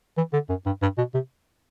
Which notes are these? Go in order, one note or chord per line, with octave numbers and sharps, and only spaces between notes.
E3
D3
F#2
G2
G2
B2
C3